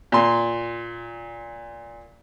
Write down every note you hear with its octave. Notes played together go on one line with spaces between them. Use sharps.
A#2 C6